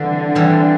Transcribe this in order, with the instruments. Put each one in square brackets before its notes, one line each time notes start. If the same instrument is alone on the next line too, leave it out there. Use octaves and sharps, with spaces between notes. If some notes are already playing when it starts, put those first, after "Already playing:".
Already playing: [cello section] D3 [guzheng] E3 G3 C4
[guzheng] E3 G3 C4